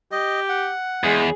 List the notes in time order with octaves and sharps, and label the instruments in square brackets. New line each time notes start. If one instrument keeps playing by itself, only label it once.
[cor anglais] G4 [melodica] D#5
[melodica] F#5
[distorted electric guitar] E2 [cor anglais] G#3 [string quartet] G#4